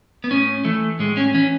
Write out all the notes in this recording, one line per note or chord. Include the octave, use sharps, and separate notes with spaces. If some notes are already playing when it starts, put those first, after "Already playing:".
B3
A2 C#4
E3 A3
A2 G#3
C#4
E3 C#4